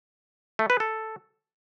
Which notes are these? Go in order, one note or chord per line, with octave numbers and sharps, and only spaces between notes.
A3
B4
A4